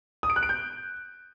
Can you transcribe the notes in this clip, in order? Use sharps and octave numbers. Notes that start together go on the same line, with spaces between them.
D#6
D7
F#6
D7
G6